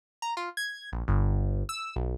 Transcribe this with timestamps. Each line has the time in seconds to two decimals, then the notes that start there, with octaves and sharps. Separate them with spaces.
0.22 A#5
0.37 F4
0.57 G#6
0.92 A#1
1.08 G1
1.69 E6
1.96 B1